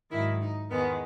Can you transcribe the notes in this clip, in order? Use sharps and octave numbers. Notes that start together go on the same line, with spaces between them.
G#2 D#3 F#3 E4
D#4
E2 D#3 G#3 B3